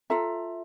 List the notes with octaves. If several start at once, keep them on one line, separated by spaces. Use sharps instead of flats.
F4 A4 E5 A#5